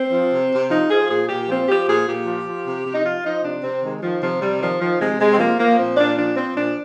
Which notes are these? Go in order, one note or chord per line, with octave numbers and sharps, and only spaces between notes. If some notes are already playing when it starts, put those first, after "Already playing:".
Already playing: C4
F3
C3
C3
F3 D#4
F3 G#4
A#2 G#4
A#2 G4
F3 C4
F3 G4
A#2 G#4
A#2 G4
F3
F3
C3
C3
D#4
F3 F4
F3 D#4
C3 D4
C3 C4
D#3 G#3
D#3 F3
C3 F3
C3 G3
D#3 F3
D#3 F3
C3 G#3
C3 G#3
C4
F3 A#3
F3 A#3
A#2 C4
A#2 D4
F3 D4
F3 C4
A#2 D4